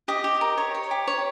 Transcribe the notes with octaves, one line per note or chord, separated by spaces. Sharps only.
G4 D#5
G4
A#4
C#5
C#5
G4
C#5